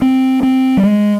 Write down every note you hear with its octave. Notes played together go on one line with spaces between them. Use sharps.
C4
C4
G3
G#3